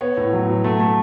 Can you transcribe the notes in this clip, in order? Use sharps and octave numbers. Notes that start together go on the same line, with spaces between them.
B3 C#5
A2
F#3
F#3
A3
A3